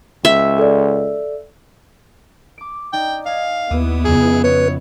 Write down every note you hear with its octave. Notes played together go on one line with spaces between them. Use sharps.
C#2 E5
A4 D5
D6 D7
D#4 D5 G5
D#5 F5 G#5 G#6
D#2 B3 E4 D#7
F2 C#3 G#4
B4 C#5